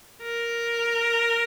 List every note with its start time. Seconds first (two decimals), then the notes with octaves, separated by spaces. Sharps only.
0.23 A#4